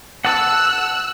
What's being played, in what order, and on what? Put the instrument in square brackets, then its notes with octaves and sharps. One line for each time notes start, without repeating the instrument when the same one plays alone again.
[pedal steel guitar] F#5 A5 [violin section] E6 F#6